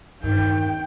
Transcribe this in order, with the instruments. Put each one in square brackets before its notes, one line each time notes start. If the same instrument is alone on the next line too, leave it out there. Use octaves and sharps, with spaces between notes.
[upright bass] E2 G2 [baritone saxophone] D#3 [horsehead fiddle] G5